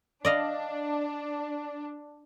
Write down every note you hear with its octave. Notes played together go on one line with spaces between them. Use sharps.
D4 D5 D#5 F5